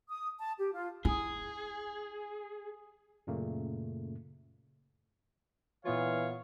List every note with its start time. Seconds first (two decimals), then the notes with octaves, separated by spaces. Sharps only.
0.09 D#6
0.38 A5
0.59 G4
0.72 F4
1.05 E4 G#4 G#5 D#6
3.27 F#2 A#2 C#3 A3 A#3
5.85 A#2 E3 B3 F4 C#5 F5